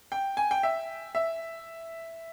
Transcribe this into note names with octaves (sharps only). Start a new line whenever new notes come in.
G5
G#5
G5
E5
E5